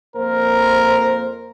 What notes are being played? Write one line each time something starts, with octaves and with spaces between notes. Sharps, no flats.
F2 A#3 A#4 C5